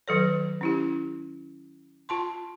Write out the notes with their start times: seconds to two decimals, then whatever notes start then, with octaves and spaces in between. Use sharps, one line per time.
0.08 D#3 F#3 A4 C#5
0.61 C#4 E4 G4
2.09 F4 A5 C6